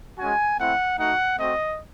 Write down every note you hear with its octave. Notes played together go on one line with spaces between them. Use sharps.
G#3 C#4 F#4 G#5
A3 C4 E4 F#5
A3 D#4 F#4 F#5
A3 C4 F#4 D#5